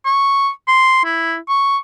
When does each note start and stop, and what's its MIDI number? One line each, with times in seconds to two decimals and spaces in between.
0.05 0.49 85
0.68 1.00 84
1.05 1.35 64
1.49 1.77 85